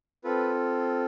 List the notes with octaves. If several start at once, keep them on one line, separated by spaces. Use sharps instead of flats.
C4 F4 A4 B4